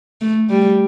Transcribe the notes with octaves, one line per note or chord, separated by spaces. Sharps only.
A3
G3